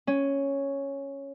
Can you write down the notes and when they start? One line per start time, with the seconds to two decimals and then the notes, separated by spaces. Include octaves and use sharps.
0.07 C#4